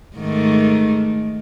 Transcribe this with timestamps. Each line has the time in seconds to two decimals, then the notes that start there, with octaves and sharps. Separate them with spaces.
0.17 G#2 D#3 A3